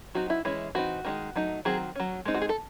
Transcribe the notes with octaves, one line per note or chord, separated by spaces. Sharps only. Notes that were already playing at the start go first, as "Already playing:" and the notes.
F#3 C4 D#4 F#4
E4
E3 G#3 C#4 E4
E3 C4 D#4 F#4
D#3 G#3 D#4
F#3 A3 D#4
D#3 F#3 C4 G#4
F#3 C#4
G#3 C4 D#4
F#4
G#4
A4